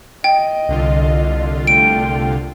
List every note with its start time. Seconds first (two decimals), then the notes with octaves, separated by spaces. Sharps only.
0.24 D#5 G5
0.69 C2 D3 F4
1.67 A3 G5 D7